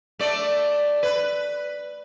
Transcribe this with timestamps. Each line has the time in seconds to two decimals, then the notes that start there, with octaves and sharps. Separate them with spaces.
0.19 A3 D5
1.03 B4